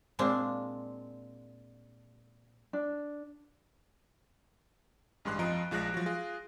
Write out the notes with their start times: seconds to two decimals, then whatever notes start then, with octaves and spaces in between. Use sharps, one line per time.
0.19 A#2 G#3 C4 D4
2.73 D4
5.25 A1 G2 G#3 C6 F#6 C7
5.39 F2 F3 D#5 A#5 D7
5.71 A#1 F3 G#3 F#6 A#6 D7
5.94 F3 F#3
6.06 F4 G#4